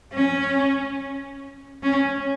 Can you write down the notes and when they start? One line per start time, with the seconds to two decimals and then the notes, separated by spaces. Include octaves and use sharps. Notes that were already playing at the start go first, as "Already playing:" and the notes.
0.13 C#4
1.83 C#4